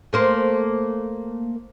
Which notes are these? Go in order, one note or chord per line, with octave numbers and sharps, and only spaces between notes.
A3 A#3 C5